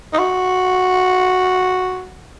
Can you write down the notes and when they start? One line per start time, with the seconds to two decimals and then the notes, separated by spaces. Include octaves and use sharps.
0.13 D#4
0.18 F#4